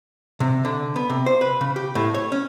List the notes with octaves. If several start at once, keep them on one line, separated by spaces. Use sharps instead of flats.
C3
D3
B3
C3
C5
B4
C#3
G4
A2
C#5
C#4